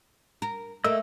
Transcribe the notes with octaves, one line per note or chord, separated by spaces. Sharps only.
A#4
A3 A#3 D#5 E6